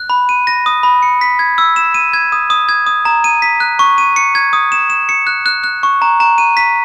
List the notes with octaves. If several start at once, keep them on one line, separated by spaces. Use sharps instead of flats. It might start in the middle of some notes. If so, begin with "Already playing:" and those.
Already playing: F#6
B5
D#7
A#6
D#6
B5
C#7
B6
G#6
E6
E7
D#7
G#6
D#6
D#6
G#6
D#6
A#5
D#7
B6
F#6
C#6
D#7
C#7
G#6
D#6
E7
E7
C#7
F#6
F#6
F#6
C#6
A#5
A#5
D#7
B6